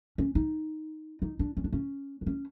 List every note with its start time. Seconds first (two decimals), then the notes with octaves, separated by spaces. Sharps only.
0.18 C#4
0.35 D#4
1.22 D#4
1.39 D4
1.57 C#4
1.64 D4
1.73 C#4
2.21 D4
2.26 C#4